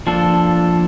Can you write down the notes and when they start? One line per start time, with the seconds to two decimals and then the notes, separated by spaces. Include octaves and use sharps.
0.07 F3 A#3 D4 A4